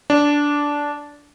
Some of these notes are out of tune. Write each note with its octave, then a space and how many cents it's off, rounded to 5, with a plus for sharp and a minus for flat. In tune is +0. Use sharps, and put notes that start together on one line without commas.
D4 -10